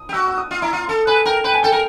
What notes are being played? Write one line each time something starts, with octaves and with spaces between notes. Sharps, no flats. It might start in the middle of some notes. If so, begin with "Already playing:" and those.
Already playing: D#6
G4
F#4 E6
E6
D#6
F4
E4 A#5
F4
A4 A5
B4 G#5
A#4 G5
B4 G5
G#5
A4 G5
A#4